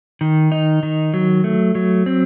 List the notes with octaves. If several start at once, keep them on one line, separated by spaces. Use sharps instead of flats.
D#3
D#4
D#3
F#3
A3
F#3
C4